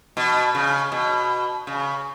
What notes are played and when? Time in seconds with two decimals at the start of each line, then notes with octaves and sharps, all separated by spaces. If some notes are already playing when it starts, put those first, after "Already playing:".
0.17 B2
0.55 C#3
0.92 B2
1.67 C#3